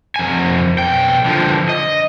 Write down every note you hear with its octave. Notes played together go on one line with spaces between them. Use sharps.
F2 G#5
B1 G5
D3 F3
D#5